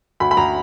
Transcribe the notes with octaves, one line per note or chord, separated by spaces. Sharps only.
D2 B5
B5
D2 A#5